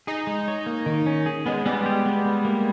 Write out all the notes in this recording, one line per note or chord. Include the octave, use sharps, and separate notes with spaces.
D#4 G#4
G#3
C#5
A#3
D#3
C#4
G#4
G#3 B3
G3 B3
G4
B3
B3
A#3